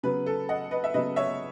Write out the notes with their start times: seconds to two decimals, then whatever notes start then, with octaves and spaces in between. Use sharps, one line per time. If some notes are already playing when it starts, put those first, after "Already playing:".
0.03 C#3 F#3 B3 B4
0.26 A4
0.49 D#5 F#5
0.71 B4 D#5
0.84 E5
0.94 C#3 F#3 B3 B4 D#5
1.16 C#5 E5